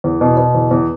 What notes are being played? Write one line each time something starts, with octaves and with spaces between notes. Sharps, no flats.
E2
B2
B2
E2
E2